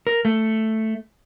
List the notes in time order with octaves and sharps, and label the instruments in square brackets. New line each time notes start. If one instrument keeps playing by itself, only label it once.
[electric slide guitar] A#4
A3